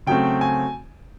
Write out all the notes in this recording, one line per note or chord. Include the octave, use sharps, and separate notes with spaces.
C#3 F#3 A3 C4 G5
G#5